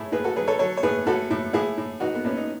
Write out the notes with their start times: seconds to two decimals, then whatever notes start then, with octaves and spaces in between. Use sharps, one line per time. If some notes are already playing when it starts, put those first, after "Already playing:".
Already playing: A2 E4 G#4 C#5
0.12 A2 G#4 B4
0.24 F#4 A4
0.36 F#3 G#4 B4
0.47 A4 C#5
0.59 F#3 A4 C#5
0.77 C#5
0.83 A2 G#4 B4
1.06 A2 F#4 A4
1.31 A2
1.53 A2 E4 G#4
1.78 A2
2.00 E3 D#4 F#4
2.15 B3
2.24 A2 C#4
2.37 D#4